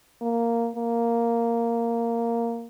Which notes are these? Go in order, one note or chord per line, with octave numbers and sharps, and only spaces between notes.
A#3
A#3